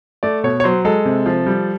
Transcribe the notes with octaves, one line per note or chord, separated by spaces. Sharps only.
A3 D5
B2 C#5
C#5
F#3 C5
G#3 A4
C3
F3
G3